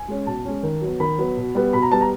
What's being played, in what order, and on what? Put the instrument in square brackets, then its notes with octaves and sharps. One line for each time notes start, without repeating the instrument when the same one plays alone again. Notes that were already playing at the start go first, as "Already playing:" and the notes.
Already playing: [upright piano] G#5
G#3 C#4
B2 A5
G#3 C#4
D#3
F#3 B3
D#3 B5
F#3 B3
B2
G3 B3
B2 B5
A#5
G3 B3 A5
A#5